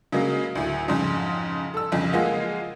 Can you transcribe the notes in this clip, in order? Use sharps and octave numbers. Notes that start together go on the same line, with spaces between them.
C#3 F#3 G#3 A#3
D2 A2
F2 G#2 C#3
A4 E6
B1 F2 C#3
G#3 A#3 F4 G#4 F#5